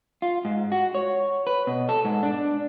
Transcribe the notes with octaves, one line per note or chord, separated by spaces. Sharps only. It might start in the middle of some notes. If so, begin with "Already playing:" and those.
F4
G#2
F#4
C#5
B4
B2
A4
G#2
D4